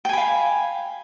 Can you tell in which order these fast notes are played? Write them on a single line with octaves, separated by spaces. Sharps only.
G5 G#5 B5 F5